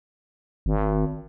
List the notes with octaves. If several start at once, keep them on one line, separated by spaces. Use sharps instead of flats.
G#1